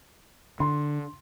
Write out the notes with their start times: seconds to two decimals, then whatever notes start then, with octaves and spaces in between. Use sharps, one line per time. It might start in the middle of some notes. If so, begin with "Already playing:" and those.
0.60 D3 C6